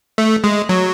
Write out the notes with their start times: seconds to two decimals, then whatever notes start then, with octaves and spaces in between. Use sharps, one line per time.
0.18 A3
0.44 G#3
0.69 F#3